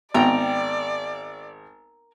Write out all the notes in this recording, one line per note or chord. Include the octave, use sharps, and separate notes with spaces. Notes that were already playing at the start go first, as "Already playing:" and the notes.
G#1 B3 C4 A#4 D5 G5 A#5